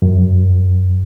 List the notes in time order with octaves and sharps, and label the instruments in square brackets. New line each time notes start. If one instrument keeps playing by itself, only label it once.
[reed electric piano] F#2